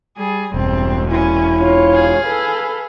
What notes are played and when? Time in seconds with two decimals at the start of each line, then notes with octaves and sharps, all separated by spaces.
0.17 G3 G#4
0.54 E1 G2 C4
1.10 A#2 C#4 E4
1.58 F4 C#5
1.93 G#4 F5
2.25 A4 B4